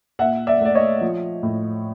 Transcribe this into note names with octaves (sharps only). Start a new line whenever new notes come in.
A#2 E5 F#5
D5 E5
A3 D5
C#5 D#5
F3
A2